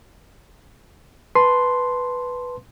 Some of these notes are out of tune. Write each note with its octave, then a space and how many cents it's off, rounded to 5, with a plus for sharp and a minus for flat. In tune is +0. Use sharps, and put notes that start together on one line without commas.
B4 +0 A5 -5 C6 +0